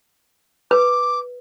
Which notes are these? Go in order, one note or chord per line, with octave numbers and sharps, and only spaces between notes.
B4 D6